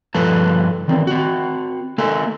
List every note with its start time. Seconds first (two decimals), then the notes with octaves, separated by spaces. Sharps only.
0.14 G2 F3 A4 B4 A5
0.88 D#3 E3 C4
1.07 C4 F#4
1.98 A#3 A4 A#4 G#5